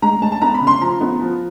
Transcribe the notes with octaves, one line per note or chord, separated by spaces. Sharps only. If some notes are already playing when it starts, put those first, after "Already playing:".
G#3 A#5
G#3 A5
A5
B3 A#5
B5
C#3
C6
F3 A#5
B3
F3